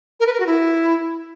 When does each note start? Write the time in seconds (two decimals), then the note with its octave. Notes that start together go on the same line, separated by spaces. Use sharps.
0.20 A#4
0.27 B4
0.33 A#4
0.40 F#4
0.47 E4